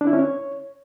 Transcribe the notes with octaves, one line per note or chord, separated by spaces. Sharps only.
D4
E4
C#4
C#5